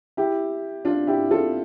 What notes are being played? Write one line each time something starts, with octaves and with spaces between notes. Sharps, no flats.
E4 G4
D4 F4
E4 G4
F4 A4